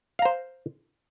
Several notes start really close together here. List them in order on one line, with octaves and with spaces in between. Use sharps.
F5 A#5 C5